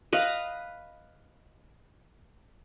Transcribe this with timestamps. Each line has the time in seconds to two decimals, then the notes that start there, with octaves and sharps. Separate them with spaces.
0.13 B4 D#5 F5